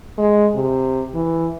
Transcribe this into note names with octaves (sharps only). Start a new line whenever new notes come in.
G#3
C3
E3